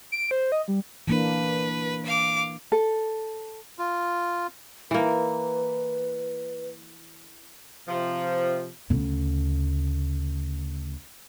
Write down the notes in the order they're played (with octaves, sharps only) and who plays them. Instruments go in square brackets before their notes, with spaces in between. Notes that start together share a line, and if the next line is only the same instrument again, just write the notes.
[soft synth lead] D7
C5
D#5
G3
[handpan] E3 A#3 D4 [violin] B4
[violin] F5 D6
[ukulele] A4
[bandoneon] F4
[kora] E3 A#3 [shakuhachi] B4
[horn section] C3 F3
[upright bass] D2 C#3